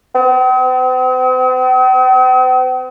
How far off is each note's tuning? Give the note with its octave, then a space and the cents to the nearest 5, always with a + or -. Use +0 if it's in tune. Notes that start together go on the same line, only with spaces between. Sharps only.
C4 -45